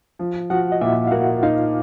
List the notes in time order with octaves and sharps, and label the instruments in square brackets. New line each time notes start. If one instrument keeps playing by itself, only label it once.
[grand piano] F3
[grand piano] F3 [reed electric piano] F#4 F#5
[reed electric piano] D#5
[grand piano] A#2 [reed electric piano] E4 E5
[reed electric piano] F5
[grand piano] A#3 [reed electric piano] F#4 F#5
[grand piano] D#4 [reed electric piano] F4 F5